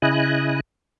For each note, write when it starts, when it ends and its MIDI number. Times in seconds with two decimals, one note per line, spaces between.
0.02 0.60 49
0.02 0.60 64
0.02 0.60 75
0.02 0.60 80
0.02 0.60 90